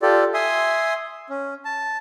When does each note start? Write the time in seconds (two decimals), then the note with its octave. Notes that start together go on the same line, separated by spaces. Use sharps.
0.02 F4 G4 A4 D5
0.34 E5 G#5 C6 D#6
1.30 C#4
1.65 A5